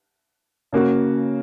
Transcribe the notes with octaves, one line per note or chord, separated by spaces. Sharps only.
C#3 A#3 F#4